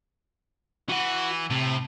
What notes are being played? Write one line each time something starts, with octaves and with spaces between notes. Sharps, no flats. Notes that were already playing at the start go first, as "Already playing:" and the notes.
E3 F#4 F#5
A2 C3